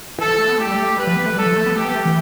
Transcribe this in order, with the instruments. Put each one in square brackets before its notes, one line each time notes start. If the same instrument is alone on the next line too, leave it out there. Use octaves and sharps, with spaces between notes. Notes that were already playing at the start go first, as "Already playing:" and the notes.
[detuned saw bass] E3 [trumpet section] A4
[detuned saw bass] F3
A3
B3
[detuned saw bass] A3 [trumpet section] G4
[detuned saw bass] G3
A3
[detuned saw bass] G3 [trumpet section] B4
[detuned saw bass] F3
B3
A3
[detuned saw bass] G3 [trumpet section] A4
[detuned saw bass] F3
A3
B3
[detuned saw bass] A3 [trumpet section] G4
[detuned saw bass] B3
A3
E3